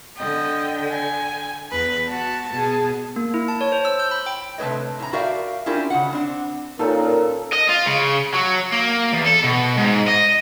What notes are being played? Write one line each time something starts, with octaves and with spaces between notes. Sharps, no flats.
D3 D#5 G5
G#5
E2 B4
F#4 A5
B2 G#4
A#3
E4
A5
C#5
C5
E6
G6
B5
G5
C3 A3 B3 B4 C#5 D#5
A2 A#5
F#4 G4 A#4 D5 E5 F5
C#4 D4 E4 F4 G4 A#4
C#3 F#5
C4 D4
A#2 C#4 D#4 F4 A4 A#4
D#5
F4
C#3
F#3
A#3
E2
A4
B2
G#2
D#5